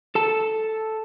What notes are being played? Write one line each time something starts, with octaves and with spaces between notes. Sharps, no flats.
A4 A5